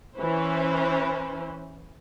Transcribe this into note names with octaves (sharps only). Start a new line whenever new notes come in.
E3 C#4 B4 C5